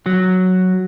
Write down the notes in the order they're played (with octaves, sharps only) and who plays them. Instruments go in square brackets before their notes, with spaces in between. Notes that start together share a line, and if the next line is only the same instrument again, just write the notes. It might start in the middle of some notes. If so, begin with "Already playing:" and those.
[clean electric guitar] F#3